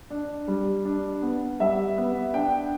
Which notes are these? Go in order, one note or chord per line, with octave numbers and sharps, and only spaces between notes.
D4
G3
D4
B3
G3 E5
B3
D4 G5